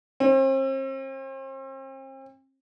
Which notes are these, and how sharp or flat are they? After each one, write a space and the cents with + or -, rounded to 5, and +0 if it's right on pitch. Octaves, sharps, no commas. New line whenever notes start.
C4 +40